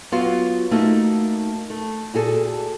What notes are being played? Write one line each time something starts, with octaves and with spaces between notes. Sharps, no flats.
F#3 B3 F4 F#4 F5
A3 A#3 D#4 F#4
A3
A#2 F#4 G#4 A4